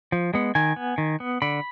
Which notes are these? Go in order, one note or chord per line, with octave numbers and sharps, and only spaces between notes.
F3
G#3 B3
D#3 G#5
B3
D#3
B3
D3 B5